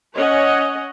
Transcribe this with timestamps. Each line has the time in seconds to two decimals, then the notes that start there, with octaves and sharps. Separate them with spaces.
0.15 C#4 C#5 D#5 F#5